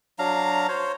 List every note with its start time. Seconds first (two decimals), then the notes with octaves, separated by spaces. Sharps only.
0.19 F#3 D4 F5 A#5
0.68 C5 C#5